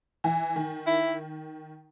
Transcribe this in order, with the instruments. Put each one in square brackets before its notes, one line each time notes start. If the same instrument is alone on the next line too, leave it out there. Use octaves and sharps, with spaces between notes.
[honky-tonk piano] E3
D#3
[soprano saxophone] E4